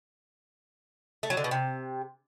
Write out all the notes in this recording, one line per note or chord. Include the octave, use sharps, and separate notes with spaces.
A3
F#3
D3
B2
C3